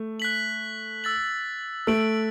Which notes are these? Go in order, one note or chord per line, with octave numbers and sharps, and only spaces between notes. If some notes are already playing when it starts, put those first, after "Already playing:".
Already playing: A3
F#6 B6 F#7
E6 A6 F#7
A3 E6 D7 F#7